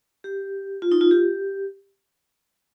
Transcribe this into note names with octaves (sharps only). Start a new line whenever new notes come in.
G4
F4
D#4
F4
G4